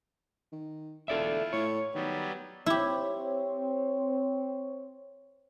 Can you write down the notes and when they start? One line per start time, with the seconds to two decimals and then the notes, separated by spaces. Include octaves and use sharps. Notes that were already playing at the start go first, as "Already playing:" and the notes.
0.52 D#3
1.08 E1 E4 F4 A4 D5 E5
1.53 A2 C#5
1.95 D#3 F#3 G3 B3
2.66 C4 E4 G4 C#5